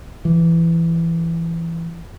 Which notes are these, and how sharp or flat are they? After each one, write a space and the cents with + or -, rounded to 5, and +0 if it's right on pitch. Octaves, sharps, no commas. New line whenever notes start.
E3 +15